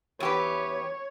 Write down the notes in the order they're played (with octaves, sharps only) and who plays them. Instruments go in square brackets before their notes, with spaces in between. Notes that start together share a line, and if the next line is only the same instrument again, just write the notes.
[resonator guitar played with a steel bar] E2 G4 B4 [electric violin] C#5